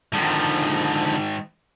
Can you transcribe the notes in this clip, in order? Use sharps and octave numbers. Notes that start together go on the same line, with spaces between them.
G#2 D3 D#3 F3